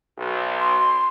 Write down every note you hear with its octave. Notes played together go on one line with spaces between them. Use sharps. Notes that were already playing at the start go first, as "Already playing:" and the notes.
B1
C6